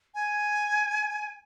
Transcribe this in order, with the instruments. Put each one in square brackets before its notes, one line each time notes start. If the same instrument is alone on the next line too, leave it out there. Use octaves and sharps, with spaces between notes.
[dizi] G#5